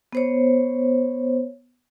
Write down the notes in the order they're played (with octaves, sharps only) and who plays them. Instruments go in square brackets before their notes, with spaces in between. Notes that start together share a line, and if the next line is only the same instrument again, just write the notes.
[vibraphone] B3 C5 C#5